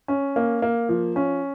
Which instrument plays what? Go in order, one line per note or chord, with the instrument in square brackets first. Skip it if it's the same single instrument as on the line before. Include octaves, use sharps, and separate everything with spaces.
[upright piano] C#4
A#3
A#3
F3
C#4